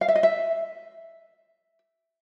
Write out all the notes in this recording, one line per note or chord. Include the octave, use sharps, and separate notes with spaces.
F5
E5
D#5
E5